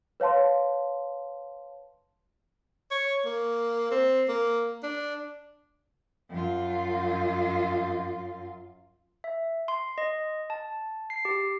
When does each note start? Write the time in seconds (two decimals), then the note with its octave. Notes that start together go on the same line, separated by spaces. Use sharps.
0.20 B4 C#5 F5 A5 C6
2.91 C#5
3.25 A#3
3.91 C4
4.28 A#3
4.83 D4
6.31 F#2 F4
9.24 E5
9.68 C6
9.98 D#5
10.50 A5
11.10 C7
11.25 G4